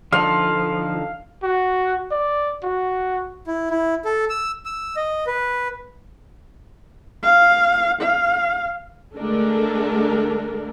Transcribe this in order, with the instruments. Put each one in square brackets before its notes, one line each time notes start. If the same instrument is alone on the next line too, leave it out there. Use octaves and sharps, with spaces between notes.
[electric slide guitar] D3 D#4 A4 [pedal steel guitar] F3 [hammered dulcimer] F5
[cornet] F#4
D5
F#4
[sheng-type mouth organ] E4
E4
A4
E6
E6
D#5
B4
[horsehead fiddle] F5
F5
[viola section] D3 G#3 A3 D4 A4 A#4